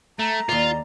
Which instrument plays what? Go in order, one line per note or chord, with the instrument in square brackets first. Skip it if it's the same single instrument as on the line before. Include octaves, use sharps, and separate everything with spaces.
[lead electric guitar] A3 [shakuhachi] A#5
[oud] D#2 D5 [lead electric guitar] F4